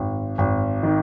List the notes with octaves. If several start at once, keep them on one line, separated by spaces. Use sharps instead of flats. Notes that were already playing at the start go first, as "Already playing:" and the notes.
Already playing: G#1
G#1
D#3